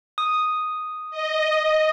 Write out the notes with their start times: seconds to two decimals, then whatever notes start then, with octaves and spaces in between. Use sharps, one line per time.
0.18 D#6
1.11 D#5